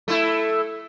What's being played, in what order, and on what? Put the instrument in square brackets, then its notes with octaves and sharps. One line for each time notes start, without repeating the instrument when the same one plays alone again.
[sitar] A3 E4